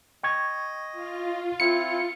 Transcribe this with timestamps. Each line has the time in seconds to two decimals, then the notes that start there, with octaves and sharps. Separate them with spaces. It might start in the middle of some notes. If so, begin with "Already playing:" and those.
0.24 D#5 G5 C#6 G#6
0.92 F4
1.60 C4 E4 C#7